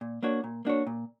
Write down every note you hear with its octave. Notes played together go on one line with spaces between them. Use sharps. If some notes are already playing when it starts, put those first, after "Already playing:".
A#2
A#3 D4 F#4 C#5
A#2
A#3 D4 F#4 C#5
A#2